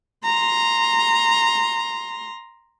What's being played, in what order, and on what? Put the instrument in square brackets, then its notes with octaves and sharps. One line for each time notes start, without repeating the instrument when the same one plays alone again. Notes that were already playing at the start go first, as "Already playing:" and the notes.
[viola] A#5 C6